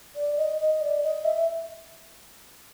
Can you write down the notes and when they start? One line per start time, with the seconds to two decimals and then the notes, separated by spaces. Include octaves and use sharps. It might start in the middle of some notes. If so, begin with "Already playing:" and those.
0.16 D5
0.37 D#5
0.59 D#5
0.81 D5
1.03 D#5
1.24 E5